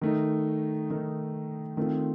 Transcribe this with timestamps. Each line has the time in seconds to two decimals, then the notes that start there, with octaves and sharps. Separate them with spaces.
0.01 D#3 A3 D#4
0.90 D#3 A3 D#4
1.77 D#3 A3 C4 F4